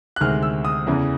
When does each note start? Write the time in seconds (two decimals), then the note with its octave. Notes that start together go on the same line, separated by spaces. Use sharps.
0.16 F#6
0.20 D2 C3 D#3 G#3 C4 F6
0.43 E6
0.65 D#6
0.87 E2 C#3 E3